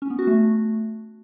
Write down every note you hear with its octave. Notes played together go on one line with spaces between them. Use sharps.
C#4
B3
F#4
A3